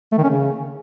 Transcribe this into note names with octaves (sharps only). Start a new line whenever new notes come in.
A3
D#3
C#4
C#3